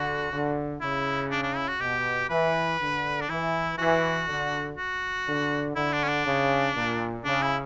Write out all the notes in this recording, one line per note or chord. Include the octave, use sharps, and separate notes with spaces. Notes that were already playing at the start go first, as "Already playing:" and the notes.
Already playing: D3 F#4
D3
C#3 E4
D4
D4
E4
F#4
B2 G4
E3 B4
D3
D4
E3 E4
E3 F#4
D3
F#4
D3
D3 E4
D4
C#4
D4
C#3
A#2
C#3 D4
E4